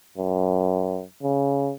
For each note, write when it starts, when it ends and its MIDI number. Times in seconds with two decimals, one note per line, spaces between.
0.18 1.03 42
1.23 1.73 49